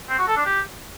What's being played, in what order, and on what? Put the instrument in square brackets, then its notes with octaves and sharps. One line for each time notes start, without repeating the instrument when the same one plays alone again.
[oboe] C4
F#4
A4
D4
G4